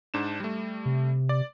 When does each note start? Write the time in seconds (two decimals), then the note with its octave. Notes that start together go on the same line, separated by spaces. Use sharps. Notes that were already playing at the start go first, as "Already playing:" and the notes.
0.14 G#2 D4 E7
0.40 G3 A3
0.86 C3
1.29 D5